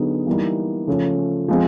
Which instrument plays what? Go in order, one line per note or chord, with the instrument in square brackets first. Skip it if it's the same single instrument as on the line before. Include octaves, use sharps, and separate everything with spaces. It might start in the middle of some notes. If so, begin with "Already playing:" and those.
Already playing: [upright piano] D3 F#3 B3 D#4 G#4
E3 G3 A#3 D#4
C#3 F3 A3 C#4
F3 G#3 C4 F4